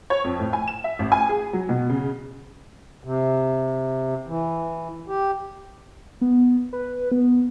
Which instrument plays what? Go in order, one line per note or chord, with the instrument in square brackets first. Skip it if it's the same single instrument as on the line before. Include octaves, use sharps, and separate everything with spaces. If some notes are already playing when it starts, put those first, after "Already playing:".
[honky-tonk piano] C#5
F2
A2
G#5
E7
E5
A1
G#5
G#4
F#3
B2
C#3
[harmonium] C3
E3
G4
[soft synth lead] B3
B4
B3